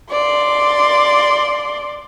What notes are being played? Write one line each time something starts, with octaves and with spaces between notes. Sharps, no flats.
D5 C6